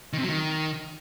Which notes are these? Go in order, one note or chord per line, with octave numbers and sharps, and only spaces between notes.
D#3
C3
F#3
D#3